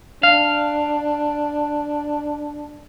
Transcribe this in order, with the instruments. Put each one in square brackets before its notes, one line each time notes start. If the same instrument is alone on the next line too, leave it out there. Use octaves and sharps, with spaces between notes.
[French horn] D4 [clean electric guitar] F5